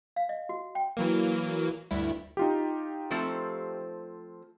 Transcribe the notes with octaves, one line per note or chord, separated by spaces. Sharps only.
F5
D#5
F#4
G5
E3 F#3 A#3
D2 G2 E4
D#4 F4 G4
F3 A3 C4